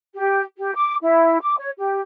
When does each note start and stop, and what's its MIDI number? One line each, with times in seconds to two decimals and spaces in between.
0.15 0.42 67
0.57 0.74 67
0.74 0.95 86
1.02 1.40 64
1.41 1.56 86
1.58 1.70 73
1.78 2.01 67